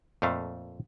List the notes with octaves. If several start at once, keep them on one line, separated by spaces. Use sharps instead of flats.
F2 A#2 A3 F5